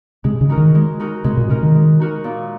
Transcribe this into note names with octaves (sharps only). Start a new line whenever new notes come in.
C3 G#3
C#3
D#4 F#4 A#4
D#3
G#3
D#4 F#4 A#4
C3 G#3
A#2
C3 D#4 F#4 A#4
D#3
G#3
D#4 F#4 A#4
A#2